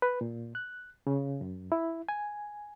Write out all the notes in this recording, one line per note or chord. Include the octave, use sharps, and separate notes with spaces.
B4
A#2
F#6
C#3
F#2
E4
G#5